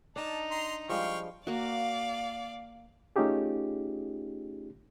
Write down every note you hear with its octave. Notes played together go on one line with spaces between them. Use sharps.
D4 D#4 A5
A#5 C6
F3 G3 G#3 F5 G5 C#6
A#3 F#4 D5 F5
A3 C#4 D#4 F4 G4 G#4